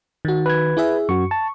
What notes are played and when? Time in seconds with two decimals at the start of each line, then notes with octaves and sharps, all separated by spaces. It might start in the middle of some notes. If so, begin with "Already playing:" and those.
0.25 D#3 F#4
0.46 B4 G#6
0.77 E4 G#4 E5
1.09 F#2 F#4 C#6
1.31 A5